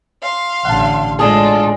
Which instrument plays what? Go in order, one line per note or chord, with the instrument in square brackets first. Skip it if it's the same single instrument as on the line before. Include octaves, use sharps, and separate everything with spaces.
[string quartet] F5 C6
[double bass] A1 D3 [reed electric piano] F#5 A5
[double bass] A2 [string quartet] G#3 F4 A4 [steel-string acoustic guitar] D4 G#4 [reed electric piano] A5 D#6